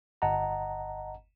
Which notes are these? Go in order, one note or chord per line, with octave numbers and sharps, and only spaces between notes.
G1 D#5 F#5 A5 A#5